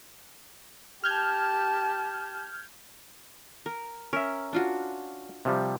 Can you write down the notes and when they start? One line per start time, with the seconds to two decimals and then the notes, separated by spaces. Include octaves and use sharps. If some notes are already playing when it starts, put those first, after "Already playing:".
1.04 G4 A5 F6 G6 G#6
3.66 A#4
4.13 C#4 A#4 E5
4.53 D4 F4 F#4
5.45 C3 F3 G3